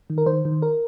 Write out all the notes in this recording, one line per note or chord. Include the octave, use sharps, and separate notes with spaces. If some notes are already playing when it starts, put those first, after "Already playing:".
D#3
A#4
D#3 C5
D#3
A#4